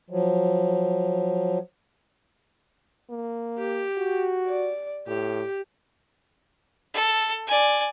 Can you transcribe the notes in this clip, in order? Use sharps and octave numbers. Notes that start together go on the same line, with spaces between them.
F3 F#3
A#3
G4
F#4
D5
A2 G4
A4
D5 G#5